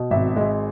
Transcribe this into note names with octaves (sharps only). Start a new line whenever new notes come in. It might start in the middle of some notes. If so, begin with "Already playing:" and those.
Already playing: B2
G#1 E5
G#3